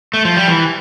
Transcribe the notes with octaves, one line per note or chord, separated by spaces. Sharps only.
A3
F3
G3
E3